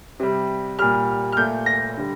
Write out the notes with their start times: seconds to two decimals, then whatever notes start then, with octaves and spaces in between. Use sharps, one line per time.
0.20 C3 G3
0.79 A#2 G3 F6
1.32 F6
1.37 A#2 A3 G6
1.66 A#6
1.97 D3 G3